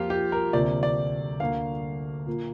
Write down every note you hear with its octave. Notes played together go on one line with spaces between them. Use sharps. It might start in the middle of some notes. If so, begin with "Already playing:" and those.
Already playing: F2 F3 A#3 F4 G4
G4
A#4
D2 C3 F3 A#3 D5
D5
D2 D3 A#3 F5
A#2 A#3